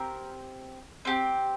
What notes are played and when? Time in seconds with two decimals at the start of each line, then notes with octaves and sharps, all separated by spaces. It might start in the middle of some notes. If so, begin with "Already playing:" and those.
Already playing: C4 G4 A#4
1.05 C4 G4